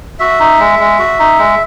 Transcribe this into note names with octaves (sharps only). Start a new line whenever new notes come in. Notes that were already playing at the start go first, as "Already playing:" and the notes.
F#4 E5
D#4
G#3
G#3
F#4
D#4
G#3